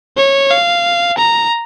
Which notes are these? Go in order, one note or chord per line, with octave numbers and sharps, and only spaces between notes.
C#5
F5
A#5